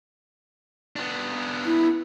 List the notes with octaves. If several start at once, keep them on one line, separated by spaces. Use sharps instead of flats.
B3 D4
E4